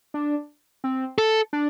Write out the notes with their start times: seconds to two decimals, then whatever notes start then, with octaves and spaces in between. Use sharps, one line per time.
0.14 D4
0.84 C4
1.18 A4
1.53 D4